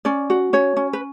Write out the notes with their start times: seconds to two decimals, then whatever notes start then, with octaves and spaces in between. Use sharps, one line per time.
0.05 C#4 D5
0.30 F#4
0.53 C#4 C#5
0.77 C#4
0.93 B4